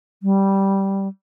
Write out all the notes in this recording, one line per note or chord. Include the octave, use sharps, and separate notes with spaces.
G3